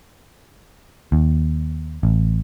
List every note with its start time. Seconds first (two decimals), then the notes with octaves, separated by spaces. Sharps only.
1.12 D#2
2.03 A1